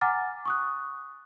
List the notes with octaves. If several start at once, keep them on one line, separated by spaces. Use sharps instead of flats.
F#5 G#5 A#5 D6 F6 A6
C#6 D#6 F#6